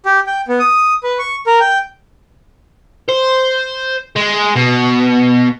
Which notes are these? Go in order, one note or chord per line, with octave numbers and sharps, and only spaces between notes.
G4
G5
B3
D#6
B4
C#6
A#4
G5
C5
G#3
B2